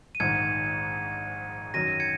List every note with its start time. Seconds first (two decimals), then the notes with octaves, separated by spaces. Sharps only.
0.15 D#7
0.20 A#1 G#2 D#3 G#6 C#7
1.74 F#2 D#3 F#3 A#6 D#7
2.00 G#6 C#7